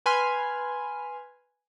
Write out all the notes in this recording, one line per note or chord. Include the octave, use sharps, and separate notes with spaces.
B4 G#5 B5 C6 F6